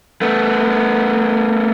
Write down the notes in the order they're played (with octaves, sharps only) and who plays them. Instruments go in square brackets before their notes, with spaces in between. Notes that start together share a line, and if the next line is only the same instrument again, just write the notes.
[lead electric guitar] A3 B3